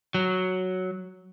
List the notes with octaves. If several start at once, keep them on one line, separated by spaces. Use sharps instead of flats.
F#3